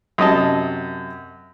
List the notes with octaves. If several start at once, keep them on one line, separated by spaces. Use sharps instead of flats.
F#2 C3 D#5 A5